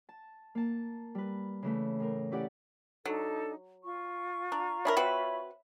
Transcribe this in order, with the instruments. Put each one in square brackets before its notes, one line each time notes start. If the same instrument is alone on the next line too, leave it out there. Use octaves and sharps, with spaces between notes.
[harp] A5
A#3 A5
G3 B4
C#3 E3 A3
A2 A#4
C#4 E4 G4 D5 F#5
[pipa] F#3 [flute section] D4 D#4 A4
[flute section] F4 C#6
[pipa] D4 [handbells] A#5
[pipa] D4 G#4 A#4 [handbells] C#5 E5 B5
[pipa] C4 F#4 B4